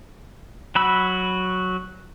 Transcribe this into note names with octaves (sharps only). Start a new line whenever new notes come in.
F#3 F#4 B5 E6